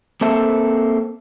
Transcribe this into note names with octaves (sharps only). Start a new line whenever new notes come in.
A#3 C4 A4 E5